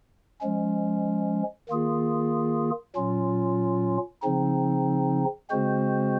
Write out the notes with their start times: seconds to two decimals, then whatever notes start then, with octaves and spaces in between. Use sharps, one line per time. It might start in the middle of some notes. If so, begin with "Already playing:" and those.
0.41 F3 G#3 C#4
1.69 D#3 A#3 F4 G#4
2.96 A#2 F#3 C#4 F4
4.23 C#3 F3 C4 D#4
5.51 C#3 G#3 C4 F#4 C5